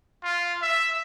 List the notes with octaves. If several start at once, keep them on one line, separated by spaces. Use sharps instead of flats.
F4
E5